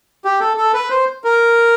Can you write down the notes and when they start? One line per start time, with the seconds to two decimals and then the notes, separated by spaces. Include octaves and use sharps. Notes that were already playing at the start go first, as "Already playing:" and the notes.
0.25 G4
0.40 A4
0.57 A4
0.74 B4
0.90 C5
1.24 A#4